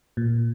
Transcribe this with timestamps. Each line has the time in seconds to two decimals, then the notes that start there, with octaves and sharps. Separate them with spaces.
0.17 A#2